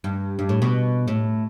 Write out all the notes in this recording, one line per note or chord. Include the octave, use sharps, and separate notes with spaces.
G2
G2
A2
B2
A2